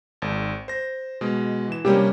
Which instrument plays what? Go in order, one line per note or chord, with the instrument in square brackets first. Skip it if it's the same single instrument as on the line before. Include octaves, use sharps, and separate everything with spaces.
[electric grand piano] G#1
C5 A#6
B2 G#3
E3 E7
[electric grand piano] C3 A#3 C#4 [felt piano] G3 G4